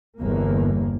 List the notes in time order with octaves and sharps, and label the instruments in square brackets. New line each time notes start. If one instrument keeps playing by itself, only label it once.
[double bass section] G1 E2 A#3